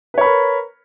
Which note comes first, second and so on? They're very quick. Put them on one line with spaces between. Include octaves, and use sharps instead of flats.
B4 C#5 B5 A#4